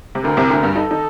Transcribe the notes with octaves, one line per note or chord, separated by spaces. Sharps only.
C3
D2 D3 A#4
C2 C3
D2 D3
G2 G3
D#4 A4
D#3 D#4